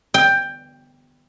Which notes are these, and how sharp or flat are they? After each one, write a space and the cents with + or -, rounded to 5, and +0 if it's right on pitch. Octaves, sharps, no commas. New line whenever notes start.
G5 +10